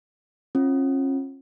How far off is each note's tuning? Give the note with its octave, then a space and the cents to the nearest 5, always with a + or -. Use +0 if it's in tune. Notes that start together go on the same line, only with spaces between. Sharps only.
C#4 -40 F4 +5